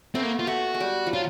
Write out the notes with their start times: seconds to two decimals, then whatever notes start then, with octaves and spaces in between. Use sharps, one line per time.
0.15 A3 B3 C4
0.23 A#3
0.40 F4
0.47 A3 F#4
0.74 G#3
0.81 G3
1.07 F3
1.13 F#3 F4